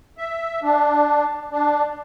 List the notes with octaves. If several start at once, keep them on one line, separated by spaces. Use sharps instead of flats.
E5
D4
D4